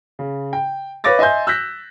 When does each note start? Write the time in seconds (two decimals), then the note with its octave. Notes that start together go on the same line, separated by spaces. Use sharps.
0.19 C#3
0.53 G5
1.04 B4 C#5 F5 D6 A6 A#6
1.19 D#5 E5 G#5 C6 G6
1.47 E6 F#6 G6 A#6 B6